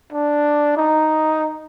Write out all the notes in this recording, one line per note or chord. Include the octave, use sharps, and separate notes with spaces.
D4
D#4